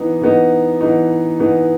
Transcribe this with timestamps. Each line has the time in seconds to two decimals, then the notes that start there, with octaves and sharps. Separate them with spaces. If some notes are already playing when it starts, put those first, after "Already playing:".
Already playing: E3 B3 D#4
0.21 E3 B3 D#4
0.81 E3 B3 D#4
1.39 E3 B3 D#4